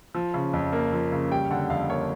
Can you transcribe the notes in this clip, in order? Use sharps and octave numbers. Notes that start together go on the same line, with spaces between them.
F3
C#3
F2
A#3
F3
C#3
G3 G5
D3 F#5
F2 F5
A#3 C#5